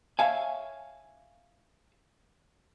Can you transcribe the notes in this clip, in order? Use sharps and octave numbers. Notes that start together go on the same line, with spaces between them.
C#5 E5 F5 G#5